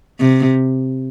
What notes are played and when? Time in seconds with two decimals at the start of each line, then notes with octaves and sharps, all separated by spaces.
0.20 C3